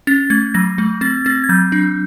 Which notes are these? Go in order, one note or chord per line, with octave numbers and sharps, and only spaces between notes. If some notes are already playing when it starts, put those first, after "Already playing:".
C#4 A6
A3 G#6
F#3 A#6
A3
C4 A6
C4 A6
G#6
F#3 G6
D4